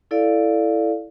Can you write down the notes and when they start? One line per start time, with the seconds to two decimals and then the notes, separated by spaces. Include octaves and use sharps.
0.11 E4 A4 D5 F5